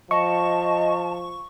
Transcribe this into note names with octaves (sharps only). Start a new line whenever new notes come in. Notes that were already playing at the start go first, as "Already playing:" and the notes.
F3 D#5 A5 C#6